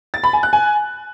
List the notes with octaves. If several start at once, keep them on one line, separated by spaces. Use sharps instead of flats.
A6
B5
G#5
F#6
G#5